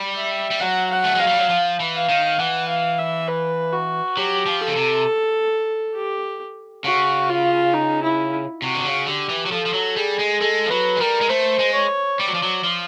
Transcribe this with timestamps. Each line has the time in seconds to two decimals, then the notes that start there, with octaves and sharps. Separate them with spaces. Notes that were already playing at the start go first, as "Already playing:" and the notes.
Already playing: G3
0.16 E5
0.51 G3
0.60 F#3 F#5
0.91 F#5
1.04 A3
1.15 G#3 F5
1.27 G3
1.39 F#3
1.49 F3
1.80 E3
1.95 F5
2.09 D#3
2.39 E3 F#5
2.69 F5
2.99 E5
3.28 B4
3.73 F#4
4.17 F#3 G4
4.46 F3
4.62 A4
4.68 C#3
4.76 C3
5.95 G4
6.84 C#3 F#4
7.29 F4
7.74 D#4
8.03 E4
8.62 C3 F#4
8.75 D3
8.85 C#3
9.07 D3 G4
9.29 E3
9.46 F#3
9.52 F3 A4
9.66 F3
9.73 F#3
9.96 G3 G#4
10.19 G#3
10.41 G#3 A4
10.66 F3
10.70 F#3 B4
10.97 G#3
11.00 G3 A#4
11.21 G#3
11.29 A3 C5
11.59 G#3
11.75 C#5
12.19 G3 D5
12.27 F#3
12.35 F3
12.43 F#3
12.64 F3